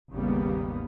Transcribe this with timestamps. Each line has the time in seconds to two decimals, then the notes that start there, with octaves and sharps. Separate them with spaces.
0.12 G#1 D#2 C#3 G3 A#3 B3